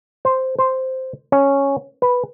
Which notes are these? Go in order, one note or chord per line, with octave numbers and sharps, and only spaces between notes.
C5
C5
C#4
B4